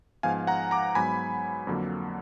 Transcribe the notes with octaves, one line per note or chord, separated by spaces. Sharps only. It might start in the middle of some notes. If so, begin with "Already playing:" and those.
G#2 F3 B3 F5 G#5
F#5 A#5
A#5 D6
G#2 F#3 B3 G#5 B5
F2 D3 F#3 A#3